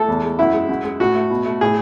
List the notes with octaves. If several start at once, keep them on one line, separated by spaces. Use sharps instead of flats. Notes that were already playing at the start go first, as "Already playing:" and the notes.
Already playing: A3 A4
E2
G#3
F#2 E4
G#3
F#2
G#3
A2 F#4
A3
B2
A3
A2 G#4